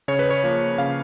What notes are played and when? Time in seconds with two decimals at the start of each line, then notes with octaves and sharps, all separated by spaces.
0.08 C#3 C#5
0.19 B4
0.30 C#5
0.44 F3 A#3
0.78 C#3 F5